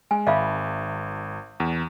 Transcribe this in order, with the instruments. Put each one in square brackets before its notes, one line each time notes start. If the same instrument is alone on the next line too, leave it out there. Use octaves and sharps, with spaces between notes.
[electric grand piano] G#3 [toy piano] G#5
[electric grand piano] G#1 [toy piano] E5 F5 B5
[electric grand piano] E2